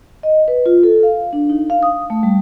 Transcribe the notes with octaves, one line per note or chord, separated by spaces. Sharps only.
D#5
B4
F4
A4
F5
D4
D#4
F5
D#6
A3
G3